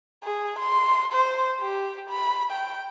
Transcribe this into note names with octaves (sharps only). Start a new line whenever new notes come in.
G#4
C6
C5
G4
B5
G5